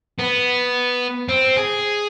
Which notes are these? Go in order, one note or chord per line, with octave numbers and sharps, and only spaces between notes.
B3
C4
G#4